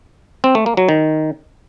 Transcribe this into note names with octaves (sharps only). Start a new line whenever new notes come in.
C4
A3
A#3
F#3
D#3